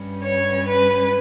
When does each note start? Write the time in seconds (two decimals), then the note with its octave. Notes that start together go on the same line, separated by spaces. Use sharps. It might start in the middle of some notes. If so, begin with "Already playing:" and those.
Already playing: G2 G3 C#4
0.23 C#5
0.67 B4